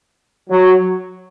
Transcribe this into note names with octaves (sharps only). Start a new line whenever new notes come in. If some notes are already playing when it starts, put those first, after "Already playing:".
F#3